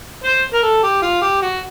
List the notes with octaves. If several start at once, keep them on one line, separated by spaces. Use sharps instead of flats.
C5
A#4
A4
G4
F4
G4
F#4